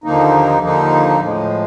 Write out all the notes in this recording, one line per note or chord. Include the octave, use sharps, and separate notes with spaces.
D#2 D3 F3 A#3 D#4
D#2 D3 F3 A#3 D#4
A2 F3 G#3